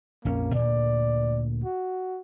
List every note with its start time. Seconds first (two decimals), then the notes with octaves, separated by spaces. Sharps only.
0.25 A#1 F2 A#3 C#4
0.55 D2 A#2 D5
1.64 F#4